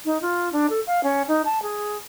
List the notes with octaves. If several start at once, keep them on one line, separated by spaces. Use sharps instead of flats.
D#4
F4
D4
A4
F5
C#4
D#4
A5
G#4